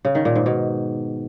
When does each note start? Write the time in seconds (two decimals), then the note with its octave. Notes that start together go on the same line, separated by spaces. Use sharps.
0.05 C#3
0.15 D#3
0.25 A#2
0.36 G#2
0.46 B2